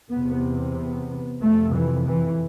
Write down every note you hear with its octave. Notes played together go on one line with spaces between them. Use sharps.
E2 C3 B3
B3
F2 C3 A3
E3
E3